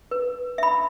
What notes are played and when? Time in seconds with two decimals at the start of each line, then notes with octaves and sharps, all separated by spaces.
0.11 B4
0.58 E5 B5